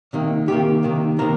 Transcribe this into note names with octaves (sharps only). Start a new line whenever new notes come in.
C3 D#3 A#3
C3 D#3 A#3 G4
C3 D#3 A#3
C3 D#3 A#3 A#4